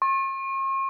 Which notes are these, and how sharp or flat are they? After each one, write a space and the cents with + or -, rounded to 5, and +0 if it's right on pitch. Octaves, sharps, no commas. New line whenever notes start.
C#6 -45